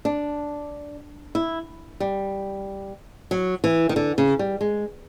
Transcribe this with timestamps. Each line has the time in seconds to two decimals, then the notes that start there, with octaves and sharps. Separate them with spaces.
0.05 D4
1.35 E4
2.00 G3
3.31 F#3
3.64 E3
3.89 D#3
3.96 D3
4.18 C#3
4.39 G3
4.61 G#3